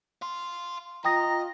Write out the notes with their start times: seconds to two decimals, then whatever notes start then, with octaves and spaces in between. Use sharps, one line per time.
0.22 F5 C6
1.05 F4 D#5 G5 A#5 D#6 A#6